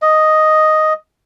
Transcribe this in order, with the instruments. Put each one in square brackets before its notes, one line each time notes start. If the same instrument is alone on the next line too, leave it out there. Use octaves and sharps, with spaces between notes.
[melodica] D#5